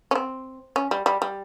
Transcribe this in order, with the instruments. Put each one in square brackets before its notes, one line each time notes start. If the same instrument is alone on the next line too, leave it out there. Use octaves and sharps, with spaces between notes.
[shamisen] C#4
C4
C#4
G3
G3
G3